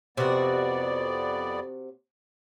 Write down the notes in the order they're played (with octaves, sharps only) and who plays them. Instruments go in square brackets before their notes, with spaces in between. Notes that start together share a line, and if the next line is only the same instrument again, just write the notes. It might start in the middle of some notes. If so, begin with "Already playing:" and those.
[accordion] F2 B3 D5 [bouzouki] C3 F#4